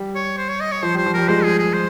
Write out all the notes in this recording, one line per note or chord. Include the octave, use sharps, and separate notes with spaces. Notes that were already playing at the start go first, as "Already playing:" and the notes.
Already playing: G3
C#5
C5
C#5
D#5
C#5
F3 C5
G3
C5
F3
G3 A#4
F3 G#3 C5
G#4
G#4
C5